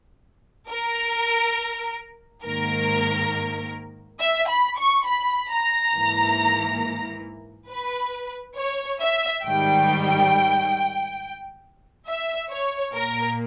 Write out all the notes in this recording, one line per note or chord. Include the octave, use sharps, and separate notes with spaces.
A#4
G#2 D#3 A#3 A#4
E5
B5
C#6
B5
A#5
G#2 E3 A#3
B4
C#5
E5
G#2 D#3 G3 G5
E5
C#5
A#2 A#3 A#4